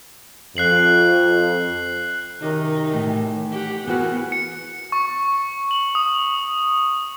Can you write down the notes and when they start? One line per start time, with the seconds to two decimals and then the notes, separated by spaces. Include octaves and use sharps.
0.57 F2 F#6 C7 F#7
2.41 F#2 C3 D#3 D#4
2.93 A2 E3
3.51 G4 F#5
3.87 E3 B3 C4 F#4 G#4 A#4 F#5
4.32 C#7
4.92 C#6
5.71 F#7
5.95 D#6